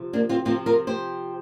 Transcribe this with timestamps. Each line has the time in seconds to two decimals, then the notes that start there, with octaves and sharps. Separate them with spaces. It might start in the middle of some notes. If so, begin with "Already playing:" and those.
Already playing: C3 F3
0.13 A#3 D4
0.29 C4 F4
0.45 C3 F3 C4 F4
0.66 F4 A#4
0.87 G4 C5